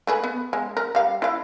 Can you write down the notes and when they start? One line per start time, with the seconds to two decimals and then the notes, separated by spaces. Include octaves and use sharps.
0.07 A3 G#4 B4
0.24 B3
0.53 G#3
0.77 A#4
0.95 G3 F5
1.22 E4 F5